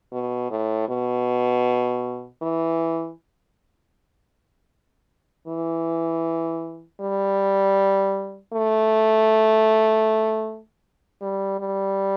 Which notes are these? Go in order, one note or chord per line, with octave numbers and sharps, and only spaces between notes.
B2
A2
B2
E3
E3
G3
A3
G3
G3